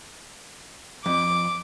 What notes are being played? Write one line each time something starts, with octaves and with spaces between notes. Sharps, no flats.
F2 D6